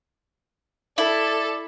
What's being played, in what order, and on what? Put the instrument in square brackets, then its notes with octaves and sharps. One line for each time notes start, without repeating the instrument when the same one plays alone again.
[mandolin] E4 [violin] A4 [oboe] D5